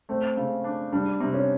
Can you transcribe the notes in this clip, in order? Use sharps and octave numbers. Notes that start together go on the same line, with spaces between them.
A3 C4
C#3
D4
G3 D4
C3
C#4